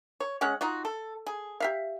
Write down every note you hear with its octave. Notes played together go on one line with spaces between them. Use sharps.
C#5
G#3 C#4 C#5 F#5
D#4 F4 F#4
A4
G#4
G4 E5 F5